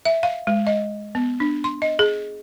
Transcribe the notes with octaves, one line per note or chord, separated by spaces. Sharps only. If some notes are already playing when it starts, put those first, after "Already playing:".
E5
F5
G#3
D#5
B3
D4
C6
D#5
G#4